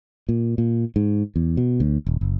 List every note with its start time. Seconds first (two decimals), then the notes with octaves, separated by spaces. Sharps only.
0.29 A#2
0.58 A#2
0.96 G#2
1.36 E2
1.57 B2
1.80 D2
2.06 D#1
2.21 F#1